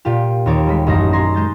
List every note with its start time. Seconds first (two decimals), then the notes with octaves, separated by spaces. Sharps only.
0.05 A#2 F4 G4
0.46 D#2 C4 C#5 A5 D6
0.67 G3 G#3 B6
0.87 A1 F#2 D#4 G#4 C6 A#6
1.13 G#5 A#5 C6 A#6
1.34 G#3 G6 A6